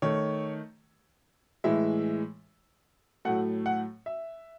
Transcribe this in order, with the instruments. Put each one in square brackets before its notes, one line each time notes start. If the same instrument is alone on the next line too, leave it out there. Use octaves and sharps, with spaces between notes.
[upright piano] D#3 A3 C#5
A2 E3 G#3 E5
A2 F#3 A3 F#5
F#5
E5